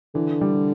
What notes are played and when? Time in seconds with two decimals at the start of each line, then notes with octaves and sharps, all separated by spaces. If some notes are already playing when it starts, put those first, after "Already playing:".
0.15 D3 E3
0.41 G3